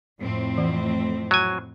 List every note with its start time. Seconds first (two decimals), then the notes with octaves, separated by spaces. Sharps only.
0.20 F2 A2 C4
0.58 E3 A3
1.31 F#3 G#5